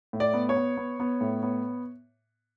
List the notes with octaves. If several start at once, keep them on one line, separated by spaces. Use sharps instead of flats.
A2
D5
B3
C#5
B3
B3
B3
A2
B3